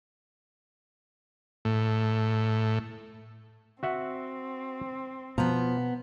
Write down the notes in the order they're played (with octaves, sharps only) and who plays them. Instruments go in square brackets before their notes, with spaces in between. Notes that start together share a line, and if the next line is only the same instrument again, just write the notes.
[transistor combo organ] A2
[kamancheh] C4 [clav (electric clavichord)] F#4 E5 F#5
[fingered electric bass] B2 [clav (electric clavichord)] F3 [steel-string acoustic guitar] B3 A#5